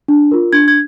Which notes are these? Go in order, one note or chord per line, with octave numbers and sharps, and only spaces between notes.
D4
F4 A#4
D4 G#6
G#6